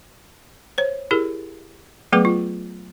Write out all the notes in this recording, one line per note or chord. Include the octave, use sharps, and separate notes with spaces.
C5 C#5
E4 G4 G#4 A#4
F#3 A3 B3 G#4 B4 D6
F4